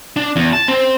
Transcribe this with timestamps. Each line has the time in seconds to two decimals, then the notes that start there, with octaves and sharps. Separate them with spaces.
0.16 D4
0.36 E2
0.53 A5
0.68 C4